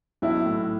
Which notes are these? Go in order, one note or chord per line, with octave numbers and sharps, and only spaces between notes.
B1 E4
A2